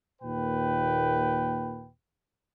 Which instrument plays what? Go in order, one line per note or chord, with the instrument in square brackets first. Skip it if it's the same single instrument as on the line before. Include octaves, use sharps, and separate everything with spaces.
[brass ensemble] D#2 A#2 B4 G5